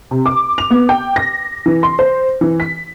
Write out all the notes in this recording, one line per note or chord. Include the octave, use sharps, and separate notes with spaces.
C3
D6
F7
B3
G5
A#6
E3
C6
C5
E3
B6